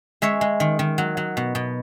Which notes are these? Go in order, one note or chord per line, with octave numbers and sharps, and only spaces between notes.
G#3 C#5 E5
G#3
D#3
D#3
F#3
F#3
B2
B2